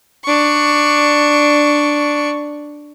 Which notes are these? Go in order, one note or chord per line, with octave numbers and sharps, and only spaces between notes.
D4 C#6